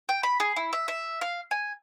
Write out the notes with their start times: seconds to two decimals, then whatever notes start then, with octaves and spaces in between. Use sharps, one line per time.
0.09 G5
0.23 B5
0.40 G#4
0.56 E4
0.73 E5
0.88 E5
1.21 F5
1.51 G#5